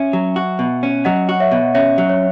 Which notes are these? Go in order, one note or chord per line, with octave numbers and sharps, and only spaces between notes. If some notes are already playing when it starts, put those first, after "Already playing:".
Already playing: C#4 E5 G#5
F#3
F#4
B2
C#4
F#3 D#5 F#5
F#4
C#5 E5
B2
C#4 C#5 E5
F#3
C#5